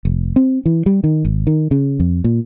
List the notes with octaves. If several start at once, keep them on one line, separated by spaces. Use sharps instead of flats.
F1
C4
E3
G3
D#3
G#1
D#3
C#3
F2
A#2